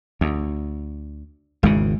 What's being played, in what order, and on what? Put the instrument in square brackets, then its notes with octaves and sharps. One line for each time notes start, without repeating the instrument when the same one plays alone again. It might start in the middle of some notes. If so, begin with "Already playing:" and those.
[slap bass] D2
[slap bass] G#1 E2 C#3 [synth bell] G#3